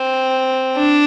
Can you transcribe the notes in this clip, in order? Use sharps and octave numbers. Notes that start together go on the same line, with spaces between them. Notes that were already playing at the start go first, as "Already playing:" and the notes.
Already playing: C4
D4